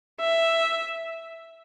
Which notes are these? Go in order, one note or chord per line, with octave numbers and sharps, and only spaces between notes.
E5